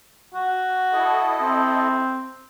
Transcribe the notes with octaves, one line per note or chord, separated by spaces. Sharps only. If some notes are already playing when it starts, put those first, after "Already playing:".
F#4
E4 A4 D#5
C4